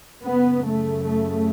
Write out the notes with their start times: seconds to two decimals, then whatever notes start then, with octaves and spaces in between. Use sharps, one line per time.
0.24 F#2 C#3 B3
0.64 A3
1.04 A3